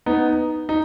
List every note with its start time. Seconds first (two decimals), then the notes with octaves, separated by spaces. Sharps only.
0.06 B3 D#4
0.69 D#4